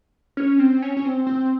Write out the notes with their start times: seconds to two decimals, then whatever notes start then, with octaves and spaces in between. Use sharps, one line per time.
0.37 C#4
0.59 C4
0.82 C#4
0.97 C#4
1.04 C4
1.27 C4